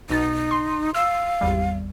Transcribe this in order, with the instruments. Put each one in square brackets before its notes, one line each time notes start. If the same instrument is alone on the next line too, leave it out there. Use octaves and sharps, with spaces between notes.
[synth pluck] B1 B2 A6 [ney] D#4
[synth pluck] C6
[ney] F5 [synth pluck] E6
[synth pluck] G#1 E2 G3